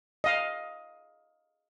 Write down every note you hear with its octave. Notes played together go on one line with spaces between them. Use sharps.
D#5 F5